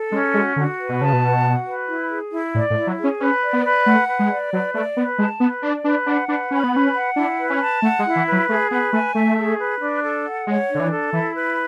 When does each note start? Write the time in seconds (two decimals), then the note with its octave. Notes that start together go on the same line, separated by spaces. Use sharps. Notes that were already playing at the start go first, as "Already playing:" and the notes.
Already playing: A4
0.11 G#3 C#4
0.34 G#3 F#4
0.56 D3 F#4
0.79 B4
0.89 B2
1.01 C#3 A5
1.13 B2
1.22 F#5
1.44 F#4
1.66 B4
1.88 E4
2.10 G#4
2.32 E4
2.54 A2 D5
2.70 A2
2.76 E4
2.87 F#3
2.98 G#4
3.04 C#4
3.20 C#4 B4
3.42 D5
3.53 B3
3.65 B4
3.86 A3 F#5
4.08 B4
4.19 G#3
4.30 D5
4.53 F#3 B4
4.74 A3 D5
4.97 B3 B4
5.18 G#3 A5
5.40 B3 B4
5.62 D4 D5
5.84 D4 B4
6.06 D4 F#5
6.28 D4 B4
6.51 C#4 B5
6.64 B3
6.73 C#4 B4
6.95 F#5
7.16 D4 E4
7.39 B4
7.50 C#4
7.61 A5
7.82 A3 F#5
7.99 G#3
8.05 E4
8.16 E3
8.27 B4
8.32 F#3
8.49 A3 G#4
8.71 B3 B4
8.92 A3 G#5
9.14 A3 E5
9.37 G#4
9.59 B4
9.80 D4
10.03 A4
10.24 F#5
10.47 G#3 C#5
10.69 D4
10.75 D3
10.80 E3
10.91 A4
11.13 E3 E4
11.34 B4